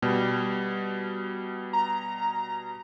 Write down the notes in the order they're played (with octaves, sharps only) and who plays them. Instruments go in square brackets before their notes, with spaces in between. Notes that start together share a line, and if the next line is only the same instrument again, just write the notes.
[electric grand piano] B2 G3
[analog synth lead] A#5